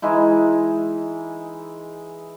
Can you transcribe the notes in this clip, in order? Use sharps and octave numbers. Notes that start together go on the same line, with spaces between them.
E3 G#3 D#4 E4